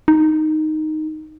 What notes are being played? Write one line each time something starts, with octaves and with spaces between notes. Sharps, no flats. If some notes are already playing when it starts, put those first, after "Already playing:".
D#4